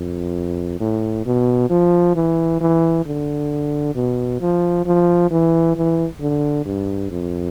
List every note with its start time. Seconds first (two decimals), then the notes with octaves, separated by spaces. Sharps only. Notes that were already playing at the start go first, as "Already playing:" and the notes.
Already playing: F2
0.80 A2
1.26 B2
1.70 F3
2.15 E3
2.61 E3
3.06 D3
3.95 B2
4.40 F3
4.86 F3
5.31 E3
5.76 E3
6.20 D3
6.66 G2
7.11 F2